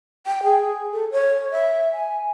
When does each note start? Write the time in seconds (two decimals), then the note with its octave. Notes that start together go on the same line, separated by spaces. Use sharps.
0.27 G5
0.43 G#4
0.93 A4
1.12 C#5
1.51 E5
1.93 G#5